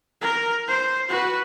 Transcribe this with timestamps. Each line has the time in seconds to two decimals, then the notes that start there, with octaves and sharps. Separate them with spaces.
0.21 A#4
0.67 C5
1.09 F#4 B4